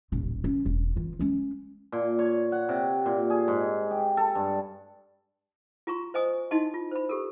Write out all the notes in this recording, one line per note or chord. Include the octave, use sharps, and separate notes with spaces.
D#1 A1
C#4
E1
E3 F4
G#3 C#4
A#2
C#5
F#5
C3
A#2
G#4
G#2
G4
A4
G2
F4 F#4 A#5 C6 C#6
C5 D#5 G#5 D#6
D#4 E4 F#4 D#5 A5 C6
F4
C5 B5
G4 A4 A#4